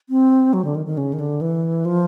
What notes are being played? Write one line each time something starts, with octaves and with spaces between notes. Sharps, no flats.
C4
F#3
D3
D#3
D#3
C#3
D#3
D3
E3
F3